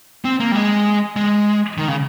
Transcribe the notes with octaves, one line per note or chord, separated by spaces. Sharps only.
C4
A#3
G3
G#3
G#3
D#3
C#3